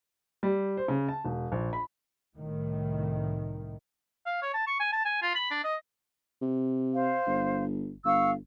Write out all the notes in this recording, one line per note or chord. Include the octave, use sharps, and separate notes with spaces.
G3
C5
C#3
A5
E1
A#1
B5
C2 A2 D#3
F5
C#5
A5
C#6
G#5
A5
G#5
F4
B5
D4
D#5
C3
C5 F5
G1
G1 F5 C#6 E6